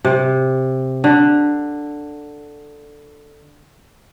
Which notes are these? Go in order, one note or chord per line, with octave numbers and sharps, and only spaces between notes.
C3
D3